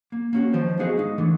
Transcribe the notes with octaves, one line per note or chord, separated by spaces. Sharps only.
A#3
A#3 C#4 F#4
D#3 F3 C5
B3 D#4 F#4 G#4 D#5 F5
G#3 D#4
D3 E3 A3